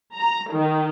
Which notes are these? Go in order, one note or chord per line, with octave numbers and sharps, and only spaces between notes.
A#5
D#3